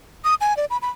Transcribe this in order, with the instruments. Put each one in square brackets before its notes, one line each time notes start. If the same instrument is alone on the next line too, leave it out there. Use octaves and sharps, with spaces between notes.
[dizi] D#6
G#5
D5
B5
B5